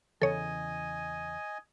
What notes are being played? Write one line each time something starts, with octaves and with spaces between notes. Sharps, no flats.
E2 C#3 E3 A4 C#5 D#5 G#5